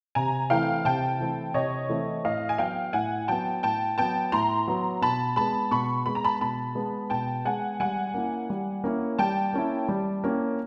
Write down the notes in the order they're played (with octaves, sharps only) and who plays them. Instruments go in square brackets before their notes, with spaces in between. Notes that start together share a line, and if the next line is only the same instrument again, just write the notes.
[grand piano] C3 [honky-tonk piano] G#5 A#5
[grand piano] E3 A3 C4 E4 [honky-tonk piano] F5 G5
[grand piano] C3 [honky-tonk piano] G5 A5
[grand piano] E3 A3 C4 E4
[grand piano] C3 [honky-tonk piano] C#5 D#5
[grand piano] E3 A3 C4 E4
[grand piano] A2 [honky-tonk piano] D#5 F5
[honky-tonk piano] G#5
[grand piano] F#3 B3 [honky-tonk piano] F5 G5
[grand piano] A2 [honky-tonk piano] F#5 G#5
[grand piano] F#3 B3 [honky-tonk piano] G5 A5
[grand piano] A2 [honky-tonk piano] G5 A5
[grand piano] F#3 B3 [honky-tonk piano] G5 A5
[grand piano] A2 [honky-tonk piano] A#5 C6
[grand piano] F#3 B3
[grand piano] B2 [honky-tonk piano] A5 B5
[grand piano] G#3 B3 [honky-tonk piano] A5 B5
[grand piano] B2 [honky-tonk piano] B5 C#6
[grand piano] G#3 B3 [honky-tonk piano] B5
[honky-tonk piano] A#5
A5 B5
[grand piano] B2 [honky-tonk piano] A5 B5
[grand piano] G#3 B3
[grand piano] B2 [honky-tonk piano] G5 A5
[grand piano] G#3 B3 [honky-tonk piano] F#5 G#5
[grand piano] G3 [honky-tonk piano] F#5 G#5
[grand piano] A#3 C#4 E4
G3
A#3 C#4 E4
[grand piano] G3 [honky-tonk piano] G5 A5
[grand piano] A#3 C#4 E4
G3
A#3 C#4 E4